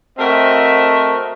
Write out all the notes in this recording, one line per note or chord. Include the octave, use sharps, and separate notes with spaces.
A3 C4 F#4 A#4 D#5 E5